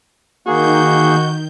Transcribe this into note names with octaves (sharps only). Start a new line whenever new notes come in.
D#3 A#3 F#4 G#4 G6